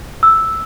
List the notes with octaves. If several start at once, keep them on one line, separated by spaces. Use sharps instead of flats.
E6